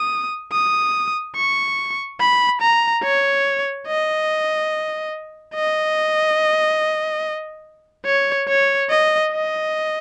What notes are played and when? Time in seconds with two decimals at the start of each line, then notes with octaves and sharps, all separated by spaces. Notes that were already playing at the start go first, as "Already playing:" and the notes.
Already playing: D#6
0.52 D#6
1.36 C#6
2.20 B5
2.61 A#5
3.03 C#5
3.87 D#5
5.55 D#5
8.06 C#5
8.49 C#5
8.90 D#5
9.32 D#5